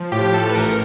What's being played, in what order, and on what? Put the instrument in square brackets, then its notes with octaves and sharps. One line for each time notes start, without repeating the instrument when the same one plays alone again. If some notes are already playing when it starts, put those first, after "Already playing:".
Already playing: [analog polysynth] F3
A2 G4
A4
B4
A1 A#4